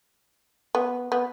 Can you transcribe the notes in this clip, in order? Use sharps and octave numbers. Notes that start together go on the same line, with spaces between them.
B3
B3